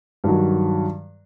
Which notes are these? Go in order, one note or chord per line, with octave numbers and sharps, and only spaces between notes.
G2 D#3 F#3